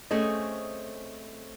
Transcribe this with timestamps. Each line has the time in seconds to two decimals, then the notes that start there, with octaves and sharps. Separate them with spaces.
0.11 A3 C4 C#4 G#4 C5 D#5